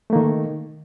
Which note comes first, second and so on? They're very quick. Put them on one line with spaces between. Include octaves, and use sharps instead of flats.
A3 A#3 D#3